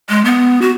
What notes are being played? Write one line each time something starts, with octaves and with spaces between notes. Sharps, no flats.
G#3
B3
F#4